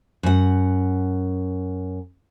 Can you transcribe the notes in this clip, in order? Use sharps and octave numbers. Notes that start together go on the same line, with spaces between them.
F#2 F#5